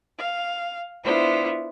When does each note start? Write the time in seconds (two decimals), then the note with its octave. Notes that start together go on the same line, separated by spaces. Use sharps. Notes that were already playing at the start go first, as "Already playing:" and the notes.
0.19 F5
1.04 B3 D4 E4 F4 C5